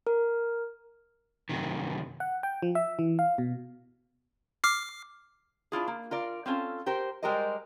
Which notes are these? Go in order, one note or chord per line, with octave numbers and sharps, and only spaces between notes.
A#4
F#2 C3 D#3
F#5
G5
F3
E5
E3
F5
B2
D6 F6 C7
D4 E4 F4 G#4
A#3
F4 A#4 D5
C4 C#4 F4 A4
G4 A#4 C5
G3 G#3 G4 A#4 C5 D#5